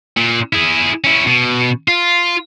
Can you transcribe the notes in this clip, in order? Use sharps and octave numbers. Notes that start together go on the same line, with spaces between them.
A#2
E4 G#4
C#4 E4
B2
F4